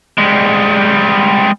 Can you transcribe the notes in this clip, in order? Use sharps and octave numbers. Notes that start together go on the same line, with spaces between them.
G3 G#3